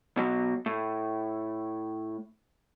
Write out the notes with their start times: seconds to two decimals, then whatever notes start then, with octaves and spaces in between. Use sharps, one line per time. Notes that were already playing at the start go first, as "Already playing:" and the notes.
0.17 B2 F#3
0.66 A2